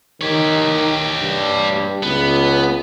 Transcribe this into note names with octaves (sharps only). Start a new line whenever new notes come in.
D#3 G4 C#5
G2
C#2 B3